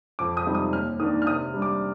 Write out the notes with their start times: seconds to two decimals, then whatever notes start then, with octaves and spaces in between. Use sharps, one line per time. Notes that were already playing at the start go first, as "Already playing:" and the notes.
0.19 F2 D6
0.37 D#6
0.46 C3 G3 C4 D#4
0.55 D#6
0.73 D#2 F6
0.99 D#3 A#3 D4 D#6
1.22 F6
1.27 C3 D#6
1.54 G3 D4
1.62 D6